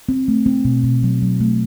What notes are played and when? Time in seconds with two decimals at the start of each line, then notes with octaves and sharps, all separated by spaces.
0.09 C4
0.28 A3
0.46 C4
0.65 B2
0.84 B2
1.03 F#3
1.22 F#3
1.41 A3